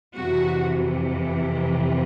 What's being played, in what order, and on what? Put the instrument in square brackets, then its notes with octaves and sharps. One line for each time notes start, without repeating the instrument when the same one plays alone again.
[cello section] F2 C3 E3 F#4